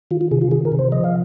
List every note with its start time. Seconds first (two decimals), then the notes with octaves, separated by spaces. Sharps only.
0.11 D#3 F4
0.21 F4
0.31 C3 G#4
0.42 F4
0.51 D#3 G#4
0.65 A#4
0.72 C3
0.79 C5
0.92 F3 D#5
1.04 F5